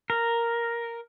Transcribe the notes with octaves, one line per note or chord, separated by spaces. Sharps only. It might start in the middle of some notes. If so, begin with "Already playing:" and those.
A#4